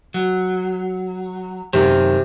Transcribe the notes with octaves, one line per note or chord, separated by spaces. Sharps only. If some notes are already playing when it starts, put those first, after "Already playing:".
F#3
F#2 C3 D#3